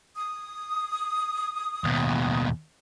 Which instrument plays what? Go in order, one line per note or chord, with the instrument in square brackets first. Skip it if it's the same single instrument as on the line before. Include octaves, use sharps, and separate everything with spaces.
[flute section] D#6
[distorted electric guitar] D#2 B2